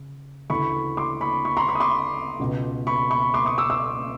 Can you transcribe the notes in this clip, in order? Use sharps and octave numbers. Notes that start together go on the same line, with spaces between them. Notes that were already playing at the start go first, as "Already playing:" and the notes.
Already playing: C#3
D2 C#3 E3 B5 C#6
C6 D6
B5 C#6
B5 C#6
A#5 C6
B5 C#6
D#6
C6 D6
C#2 B2
B5 C#6
B5 C#6
C6 D6
C#6 D#6
D6 E6
D6 E6